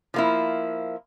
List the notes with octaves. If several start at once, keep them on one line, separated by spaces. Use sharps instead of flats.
F3 A#3 E4